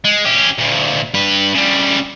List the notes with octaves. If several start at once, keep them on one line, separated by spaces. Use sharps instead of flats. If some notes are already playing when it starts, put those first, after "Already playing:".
G#3
C#4 G4
D2 A#2
G2 B4
C#3 G3